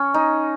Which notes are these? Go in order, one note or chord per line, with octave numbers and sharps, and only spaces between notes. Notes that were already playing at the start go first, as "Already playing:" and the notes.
Already playing: C#4
D#4